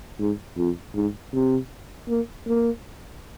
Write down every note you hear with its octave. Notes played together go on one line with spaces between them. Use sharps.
G#2
F2
G#2
C3
A#3
A#3